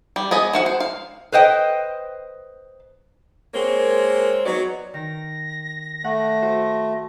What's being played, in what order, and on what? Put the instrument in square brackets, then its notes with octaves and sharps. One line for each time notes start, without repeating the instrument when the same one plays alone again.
[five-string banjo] G3
B3 G#4 D#5
F3 F#4 F#5
C5
F5
[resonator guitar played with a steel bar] B4 C5 D#5 G5
[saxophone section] G#3 A#3 C4 A#4 C#5
F#3 B3 D#4 F#4 C#5 D5
[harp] D#3 [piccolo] A#6
[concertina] A3 [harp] F#5
[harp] F#4 C5